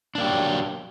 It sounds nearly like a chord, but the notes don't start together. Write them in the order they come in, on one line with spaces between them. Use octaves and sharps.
D4 A#3 G4 F#3